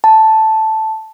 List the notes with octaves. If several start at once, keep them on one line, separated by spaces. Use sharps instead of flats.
A5